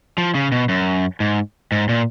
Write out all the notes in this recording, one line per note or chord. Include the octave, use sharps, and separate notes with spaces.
F3
C#3
B2
F#2
G#2
G#2
A#2